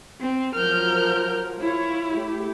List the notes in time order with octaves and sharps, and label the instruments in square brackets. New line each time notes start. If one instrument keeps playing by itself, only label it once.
[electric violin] C4
[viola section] F3 F#3 A#4 [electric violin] F6 G6
[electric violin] E4 [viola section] F4 C#5
[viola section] A3 G4